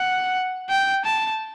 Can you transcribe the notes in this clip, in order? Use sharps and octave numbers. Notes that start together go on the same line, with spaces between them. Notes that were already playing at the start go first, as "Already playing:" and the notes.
Already playing: F#5
G5
A5